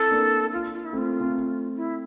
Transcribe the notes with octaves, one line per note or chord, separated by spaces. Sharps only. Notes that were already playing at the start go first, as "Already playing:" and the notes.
Already playing: C4 E4 A4
A#3 D4
F4
F4
E4
A3 C4 F4
A3 C4
E4